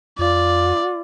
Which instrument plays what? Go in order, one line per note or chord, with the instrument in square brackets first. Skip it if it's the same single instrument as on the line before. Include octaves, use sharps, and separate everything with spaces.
[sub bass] F2 [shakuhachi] F4 [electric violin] D5